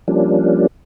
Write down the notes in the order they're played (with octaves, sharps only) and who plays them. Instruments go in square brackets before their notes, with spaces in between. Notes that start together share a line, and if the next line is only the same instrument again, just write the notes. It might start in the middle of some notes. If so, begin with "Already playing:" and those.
[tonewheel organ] F3 G3 A#3 C#4 D4